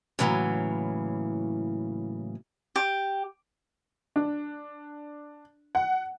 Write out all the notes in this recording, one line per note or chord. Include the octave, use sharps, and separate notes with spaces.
A2 C#3 E3 F#3 A#3
G4
D4
F#5